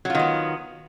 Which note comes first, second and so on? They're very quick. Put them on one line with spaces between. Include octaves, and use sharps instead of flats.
F#3 F4 D#3 B3